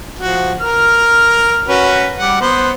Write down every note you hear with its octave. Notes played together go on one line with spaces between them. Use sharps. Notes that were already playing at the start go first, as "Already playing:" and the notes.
F3 F#4
A#4 F6
C#4 F#4 B4
G3 F#5
B3 C5